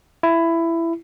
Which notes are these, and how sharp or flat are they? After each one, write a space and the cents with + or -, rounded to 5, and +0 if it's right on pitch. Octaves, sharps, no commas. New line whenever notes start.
E4 +15